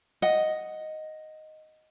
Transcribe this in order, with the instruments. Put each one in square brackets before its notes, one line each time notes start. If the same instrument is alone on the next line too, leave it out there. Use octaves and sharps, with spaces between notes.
[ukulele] D#5 F#5